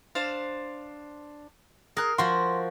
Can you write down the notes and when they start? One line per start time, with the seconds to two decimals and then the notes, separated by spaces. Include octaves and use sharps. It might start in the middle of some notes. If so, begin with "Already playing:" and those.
0.15 D4 C5 F5
1.97 G#4 A#4 F#6
2.18 F3 F#4 C6